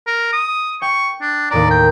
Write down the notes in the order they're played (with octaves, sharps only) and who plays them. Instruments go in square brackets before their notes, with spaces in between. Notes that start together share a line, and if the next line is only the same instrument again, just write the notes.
[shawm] A#4
D#6
[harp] G5 [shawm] C#6
[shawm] D4
[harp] D#2 A2 A#5 [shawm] D5
[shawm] G5